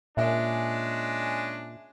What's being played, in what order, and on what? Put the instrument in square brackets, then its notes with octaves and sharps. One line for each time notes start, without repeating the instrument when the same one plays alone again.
[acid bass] A#2 [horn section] G#3 C#4 D4 [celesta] E5